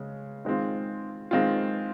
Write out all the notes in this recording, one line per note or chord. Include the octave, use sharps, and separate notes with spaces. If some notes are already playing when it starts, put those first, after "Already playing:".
Already playing: C#3 G#3
D#3 G#3 C4 F4
D#3 G#3 C4 F4